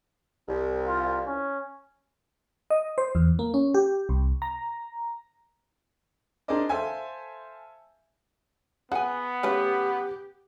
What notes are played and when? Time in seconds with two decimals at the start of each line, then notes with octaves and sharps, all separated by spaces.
0.48 C2
0.88 F4
1.27 C#4
2.70 D#5
2.98 C5
3.15 E2
3.39 A#3
3.54 C#4
3.74 G4
4.09 C2
4.42 A#5
6.48 D4 G#4 A#4 C5 D5 D#5
6.69 A4 C5 E5 F5 G#5
8.92 B3 G#4 F#5 G#5
9.43 C#3 A3 G4 B4